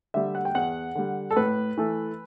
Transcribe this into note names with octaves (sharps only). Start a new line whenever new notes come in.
D3 G3 E5
F#5
G5
E2 F#5
D3 G3
A4
A2 B4
E3 A3